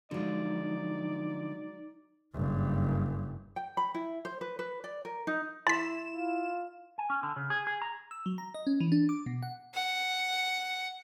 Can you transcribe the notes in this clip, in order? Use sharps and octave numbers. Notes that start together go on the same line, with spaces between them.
D3 F3 F#3 G#3 D#4 D5
F#1 G2
G5
B5
E4
C5
B4
B4
D5
A#4
D#4
E4 C6 A6 B6 E7
F4
G#5
C#4
D3
C#3
G#4
G#4
A#5
E6
F#3
A#5
D#5
C#4
E3
D4
D6
B2
F#5
F#5